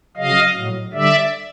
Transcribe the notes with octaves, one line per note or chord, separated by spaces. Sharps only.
C#3 F#3 D#5 F5
A2 F#3
D3 G3 D5 E5